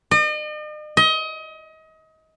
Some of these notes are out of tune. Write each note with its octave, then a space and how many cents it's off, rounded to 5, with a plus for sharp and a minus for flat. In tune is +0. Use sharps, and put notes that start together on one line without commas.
D#5 -45
D#5 +30